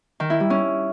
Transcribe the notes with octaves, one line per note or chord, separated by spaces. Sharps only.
D#3
E4
G3
C#4